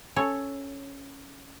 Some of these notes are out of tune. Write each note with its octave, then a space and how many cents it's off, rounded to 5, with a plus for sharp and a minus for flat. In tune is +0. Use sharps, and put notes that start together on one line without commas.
C#4 +0 A4 +0 C#5 +0